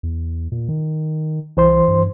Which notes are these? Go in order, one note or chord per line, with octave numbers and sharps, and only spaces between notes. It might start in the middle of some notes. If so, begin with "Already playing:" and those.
E2
A#2
D#3
C2 E3 C5 C6
G2